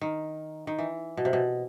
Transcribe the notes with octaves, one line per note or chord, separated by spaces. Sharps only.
D#3
D#3
E3
B2
C3
B2